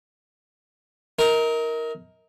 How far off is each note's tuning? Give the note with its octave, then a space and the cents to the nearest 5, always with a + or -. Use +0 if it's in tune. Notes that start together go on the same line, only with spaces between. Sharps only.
D#4 +40 A#4 +0